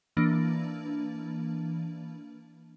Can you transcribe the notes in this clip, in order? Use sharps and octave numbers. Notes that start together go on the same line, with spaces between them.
E3 A#3 D4